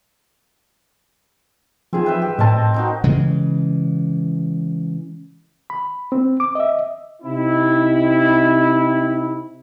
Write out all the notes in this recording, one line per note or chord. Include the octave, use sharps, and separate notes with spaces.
D#3 F3 C4 G#4
B4 E5 G5
G4
A2 C4 A#4 D#5 A5
C4 D#4 F#4
C#3 E3 G#3
B5
C4
D6
D#5 E5
C3 C4 D#4 E4